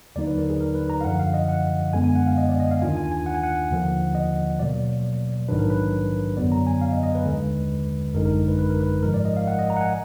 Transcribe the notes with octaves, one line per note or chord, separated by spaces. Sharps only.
D#2 D3 F#3 A#3 D#4 D5
B4
A#4
G#4
A#4
B4
A#5
F5
F#2 D3 F3 F#5
F5
D#5
F#5
F#2 D3 G#3 B3 G#5
G#5
F#5
F5
D#5
D5
D#5
F5
D#2 D#3 A#3 D4 F4 G#5
G#5
G#5
F#5
G#5
F#5
D#2 D3 F3 A#3
D#5
B2 F#3 A#3 D5
A#1 G#2 D#3 F#3 D4 B4
A#4
B4
F#2 D3 F#3 B3 D5
A#5
G#5
F5
D#5
D#5
B4
D#2 D3 G#3
G#1 F#2 D3 G#3 D#4 A#4
A#4
B4
B4
A#4
B4
G#2 F3 G#3 A#4
D5
D#5
F5
F#5
D#5
A#5
F#5
G#5